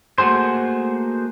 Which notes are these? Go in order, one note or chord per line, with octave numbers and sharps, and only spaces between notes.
A3 A#3 F#4 G#4 C5